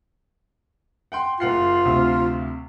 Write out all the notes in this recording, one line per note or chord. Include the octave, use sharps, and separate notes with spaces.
F#5 G5 C6
F#1 F4 F#5 C7
D2 C3